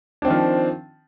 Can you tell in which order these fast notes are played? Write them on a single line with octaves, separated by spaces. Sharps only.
D4 C4 D#3 F3